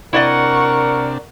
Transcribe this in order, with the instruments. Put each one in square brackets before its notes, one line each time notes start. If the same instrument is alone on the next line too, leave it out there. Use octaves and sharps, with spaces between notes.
[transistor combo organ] C3 D4 [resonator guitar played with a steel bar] E4 D5 D#5 [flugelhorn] A#4 [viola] F#5 C#6